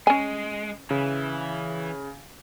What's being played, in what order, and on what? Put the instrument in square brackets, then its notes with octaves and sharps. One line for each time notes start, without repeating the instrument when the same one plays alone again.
[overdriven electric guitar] G#3 [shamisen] C#4 G#5
[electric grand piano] C#3 [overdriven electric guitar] E3